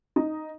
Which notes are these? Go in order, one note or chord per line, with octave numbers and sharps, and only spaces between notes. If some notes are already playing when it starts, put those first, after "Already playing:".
D#4